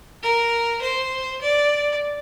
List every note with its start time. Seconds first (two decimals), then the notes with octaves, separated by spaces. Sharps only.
0.23 A#4
0.81 C5
1.41 D5